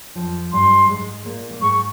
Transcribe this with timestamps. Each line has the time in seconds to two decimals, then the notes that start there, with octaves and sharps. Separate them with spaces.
0.15 F2 F3
0.53 G2 G3 C6
0.89 G#2 G#3
1.25 A#2 A#3
1.51 A#3
1.61 G#2 G#3 C#6